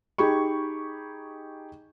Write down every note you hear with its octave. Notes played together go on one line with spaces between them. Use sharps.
D#4 G4 G#4 B5 C#6